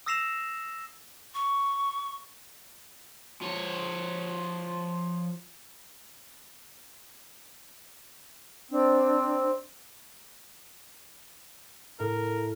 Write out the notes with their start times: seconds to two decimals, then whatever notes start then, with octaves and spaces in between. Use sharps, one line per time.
0.06 D#6 E6 A#6 C7 E7 F7
1.34 C#6
3.42 F3 C#5
8.71 C4 D4
12.00 A2 A#4